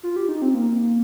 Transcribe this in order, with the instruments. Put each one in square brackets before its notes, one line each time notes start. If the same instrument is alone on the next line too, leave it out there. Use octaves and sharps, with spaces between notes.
[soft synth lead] F4
G4
D#4
C4
A#3